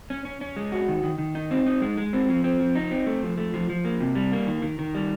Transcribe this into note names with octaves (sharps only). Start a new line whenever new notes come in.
C#4
C#4
C#4
G#3
F#4
D#3
D#3
D#3
D#4
C4
D#4
G#3
G#3
C4
F3
C4
F3
D#4
C4
A3
F3
A3
F3
F3
A#3
C3
G3
A#3
D#3
D#3
D#3
G3